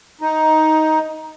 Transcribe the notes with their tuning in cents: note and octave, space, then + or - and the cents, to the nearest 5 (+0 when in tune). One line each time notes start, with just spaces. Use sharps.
D#4 +10